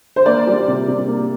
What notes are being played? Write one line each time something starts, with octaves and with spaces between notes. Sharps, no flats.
C5
A#3 D5
G3
C3
C3
A#3